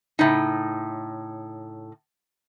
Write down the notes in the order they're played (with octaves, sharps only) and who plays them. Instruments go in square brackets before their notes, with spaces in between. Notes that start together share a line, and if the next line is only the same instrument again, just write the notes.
[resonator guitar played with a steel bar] A2 C#3 D#4